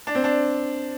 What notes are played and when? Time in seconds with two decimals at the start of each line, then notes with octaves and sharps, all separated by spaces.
0.07 D4
0.15 C4
0.24 D4